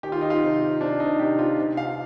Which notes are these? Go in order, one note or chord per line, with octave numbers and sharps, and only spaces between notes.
D#3 G4
F4
D#4
F4
C3
C3 D4
D#4
C3 G4
F4
C3
F5